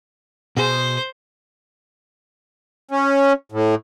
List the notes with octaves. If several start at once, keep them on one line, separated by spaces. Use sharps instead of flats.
B2 G#4 C5
C#4
A2